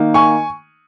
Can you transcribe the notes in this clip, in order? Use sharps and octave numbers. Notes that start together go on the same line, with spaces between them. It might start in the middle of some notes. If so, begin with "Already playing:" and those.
Already playing: D#3 A#3 D#4
G#5 C#6